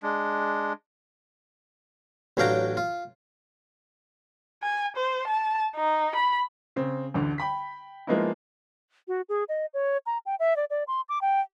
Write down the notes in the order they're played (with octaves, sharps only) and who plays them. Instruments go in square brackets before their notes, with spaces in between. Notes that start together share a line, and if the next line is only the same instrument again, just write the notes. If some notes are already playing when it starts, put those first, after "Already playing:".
[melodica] G#3 D4
[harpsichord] A1 F#3 D4 F5 G5 A#5
F4
[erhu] G#5
C5
A5
D#4
B5
[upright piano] C#3 C4
A1 D2 D3
G5 B5 B6
F3 G#3 A#3 B3 D#4 E4
[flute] F#4
G#4
D#5
C#5
A#5
G5
E5
D5
D5
C6
D6
G5